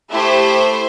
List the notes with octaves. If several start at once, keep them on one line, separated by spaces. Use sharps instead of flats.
A3 E4 G4 C5 E5